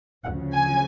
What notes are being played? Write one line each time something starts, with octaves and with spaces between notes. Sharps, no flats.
D2 C#3 F3 F#5
G#5